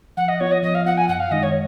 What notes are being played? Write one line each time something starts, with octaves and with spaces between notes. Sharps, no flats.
F3 F#5
D#5
B3 F4 C#5
D#5
F3 D#5
F5
B3 F4 F#5
G#5
F#2 F#5
F5
D#3 G#3 D#4 D#5
C#5